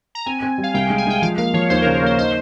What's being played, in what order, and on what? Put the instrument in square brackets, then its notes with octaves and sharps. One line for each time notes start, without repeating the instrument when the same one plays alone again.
[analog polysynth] A#5
[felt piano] C4 [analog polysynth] G#5
[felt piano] C4
G3
[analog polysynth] F5
[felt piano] C2 [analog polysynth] G5
[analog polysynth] G5
[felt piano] G#3
[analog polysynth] G#5
[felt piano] G#3 [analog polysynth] G5
[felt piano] F3 [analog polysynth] F5
[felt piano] A#3 [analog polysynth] F5
[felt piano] F3 [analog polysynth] C#5
[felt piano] D#2 [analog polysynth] C5
[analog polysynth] A#4
[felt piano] C#3
[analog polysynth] A#4
[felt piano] A#3 [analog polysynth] C5
[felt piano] D#4 [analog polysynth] C5